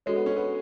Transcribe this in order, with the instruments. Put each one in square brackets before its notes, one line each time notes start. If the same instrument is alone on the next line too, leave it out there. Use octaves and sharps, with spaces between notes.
[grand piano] G#3 [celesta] D4 F#4 A4 C#5
[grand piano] B3
C#4
B3